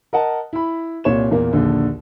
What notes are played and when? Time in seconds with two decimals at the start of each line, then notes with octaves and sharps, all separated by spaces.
0.13 A#4 D#5 F#5 A5
0.53 E4 B5
1.04 C2 A#2 C#5 E7
1.31 E2 A#2 A#3
1.53 A#1 D#2 D3